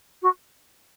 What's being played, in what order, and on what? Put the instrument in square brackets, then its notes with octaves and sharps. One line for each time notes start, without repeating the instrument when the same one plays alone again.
[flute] F#4